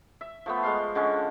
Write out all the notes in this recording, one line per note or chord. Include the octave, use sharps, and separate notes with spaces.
E5
F3 A3 B3
G#3 F5 C6
D3 G#3 C#4